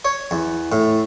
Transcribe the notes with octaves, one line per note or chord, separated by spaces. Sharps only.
C#5
E2
A2